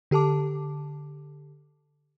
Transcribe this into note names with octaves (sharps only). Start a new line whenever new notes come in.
D3 G4 A4 A5 D6